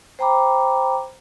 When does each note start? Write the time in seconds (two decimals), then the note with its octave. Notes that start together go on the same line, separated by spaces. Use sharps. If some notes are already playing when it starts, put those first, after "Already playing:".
0.19 C5 G5 A#5 B5 D6